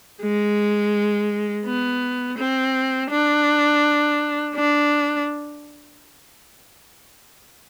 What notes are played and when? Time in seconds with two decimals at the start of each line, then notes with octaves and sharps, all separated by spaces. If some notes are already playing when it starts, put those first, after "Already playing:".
0.22 G#3
1.65 B3
2.38 C4
3.10 D4
4.54 D4